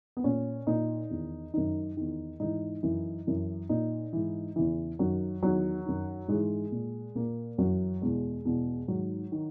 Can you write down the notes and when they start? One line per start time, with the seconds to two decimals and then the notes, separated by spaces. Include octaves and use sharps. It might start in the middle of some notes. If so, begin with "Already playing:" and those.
0.17 B3
0.24 A#2 C#4
0.67 A#2 D#4
1.10 E2 D#3
1.54 F#2 D#3 D#4
1.97 E2 D#3
2.40 G#2 E3 D#4
2.83 F#2 E3
3.27 F#2 E3
3.69 A#2 D#4
4.13 G#2 E3
4.56 E2 C#3 E3
4.99 F#2 D#3 F#3
5.42 E2 D#3 F#3
5.86 F#2 D#3
6.28 G#2 E3 G#3
6.72 A#2
7.15 A#2 A#3
7.58 F#2 E3 F#3
8.02 E2 B2 G#3
8.45 E2 B2
8.88 G#2 D#3 F#3
9.32 D#3